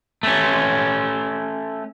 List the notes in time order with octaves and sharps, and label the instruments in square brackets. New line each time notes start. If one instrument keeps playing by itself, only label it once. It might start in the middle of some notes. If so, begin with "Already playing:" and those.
[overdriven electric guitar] A3 C#4